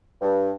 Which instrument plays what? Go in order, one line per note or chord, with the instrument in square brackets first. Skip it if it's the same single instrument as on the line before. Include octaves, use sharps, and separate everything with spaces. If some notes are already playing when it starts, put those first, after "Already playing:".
[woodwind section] G2